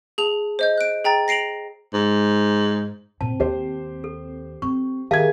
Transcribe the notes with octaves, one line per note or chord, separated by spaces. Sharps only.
G#4 A5 F7
C5 D#5 G6
F#6 D7
G#4 G5 A#5 A6
A#6 C7 D7 F7 F#7
G#2
A#2 C4 E4 A5
D#2 D#3 G4 C5
A4
C4 C#6
D#3 G4 G#4 A#4 E5 F5 A5 G#6